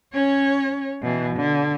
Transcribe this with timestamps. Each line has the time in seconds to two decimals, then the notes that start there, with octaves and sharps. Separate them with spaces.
0.13 C#4 C#5
1.02 B2 E3
1.37 D3